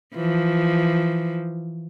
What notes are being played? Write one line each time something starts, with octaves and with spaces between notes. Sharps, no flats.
E3 F3